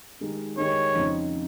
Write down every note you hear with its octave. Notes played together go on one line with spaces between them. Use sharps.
D#3 G#3 D#4 G4
D#3 G#3 D#4 G4 C#5
F2 C#3 F3 C4 D#4